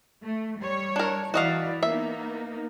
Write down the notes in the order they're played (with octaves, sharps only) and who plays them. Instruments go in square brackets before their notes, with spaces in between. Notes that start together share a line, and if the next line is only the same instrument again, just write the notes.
[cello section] A3
G3 C#5
[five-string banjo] D4 A#4
[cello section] E3 E4 D5 [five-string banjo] F#4 D#5 F5
[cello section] A#3 B3 D#4 [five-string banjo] E5